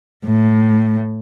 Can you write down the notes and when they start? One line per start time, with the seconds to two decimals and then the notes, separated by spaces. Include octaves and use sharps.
0.25 A2